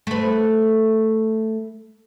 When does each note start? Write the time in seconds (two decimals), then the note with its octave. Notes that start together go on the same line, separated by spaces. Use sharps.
0.07 A3 B4